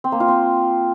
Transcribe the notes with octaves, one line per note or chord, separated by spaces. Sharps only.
C4
A#3
F4
C4